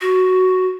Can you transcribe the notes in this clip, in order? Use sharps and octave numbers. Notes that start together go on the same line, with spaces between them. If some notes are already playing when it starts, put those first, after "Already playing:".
F#4